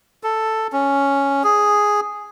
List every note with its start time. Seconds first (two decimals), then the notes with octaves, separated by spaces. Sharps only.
0.23 A4
0.73 C#4
1.44 G#4